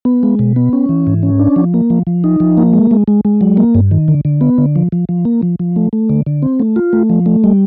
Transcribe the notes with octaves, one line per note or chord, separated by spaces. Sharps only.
B3
G#3
B2
B3
C#4
E3
G#2
C#4
D4
F3
A#3
F3
F3
D#4
F3
A#3
G#3
G#3
G#3
G#3
F#3
A#3
G2
D#3
D3
D3
B3
D3
F3
F3
F3
A#3
F3
F3
A3
A3
D3
D3
C4
A3
F4
A3
F3
A3
G3